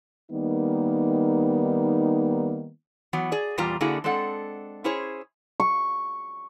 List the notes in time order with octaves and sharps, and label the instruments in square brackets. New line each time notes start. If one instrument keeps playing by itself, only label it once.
[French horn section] D#3 G3 A#3 B3 D#4
[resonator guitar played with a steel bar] E3 F#3 B3
G#4 D5
E2 A#2 G3 F4 A#5
D3 A#3 D4 E4 F#4 G#4
G#3 C4 D4 A4 F#5
C#4 E4 G#4 C5 C#5
[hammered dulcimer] C#6